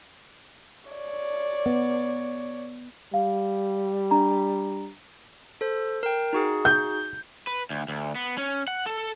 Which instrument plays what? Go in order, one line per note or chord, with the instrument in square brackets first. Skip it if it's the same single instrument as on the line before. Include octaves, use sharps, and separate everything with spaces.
[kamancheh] C#5 D5
[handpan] B3
[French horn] G3 [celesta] F5
[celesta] D4 A#5
[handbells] A4 C5
A#4 G5
D#4 F#4 G#4
[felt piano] G6
[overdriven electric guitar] B4
D2
D2
B3
C#4
F#5
A4